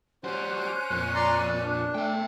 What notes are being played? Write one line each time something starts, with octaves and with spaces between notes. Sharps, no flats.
G3 C#4 F#4 C5 F#6
F2 A#2
D5 A#5 C6
D5
D4
A3 E5 G5